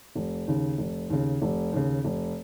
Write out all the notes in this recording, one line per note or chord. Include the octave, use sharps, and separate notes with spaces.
F1
D#2 C#3
F1
D#2 C#3
F1
D#2 C#3
F1